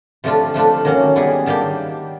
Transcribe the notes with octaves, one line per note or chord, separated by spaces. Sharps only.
C3 F3 A3 D4 F4
F3 A3 D4 F4
D#3 F#3 A#3 C#4 F#4
G3 B3 E4 G#4
D#3 G3 A#3 D4 G4